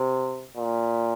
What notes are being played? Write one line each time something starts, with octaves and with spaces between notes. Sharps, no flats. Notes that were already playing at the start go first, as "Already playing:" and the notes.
Already playing: C3
A#2